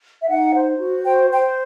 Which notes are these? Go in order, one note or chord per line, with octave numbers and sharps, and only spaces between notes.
E5
D#4 F#5
C5
F#4
C5 G5
C5 G5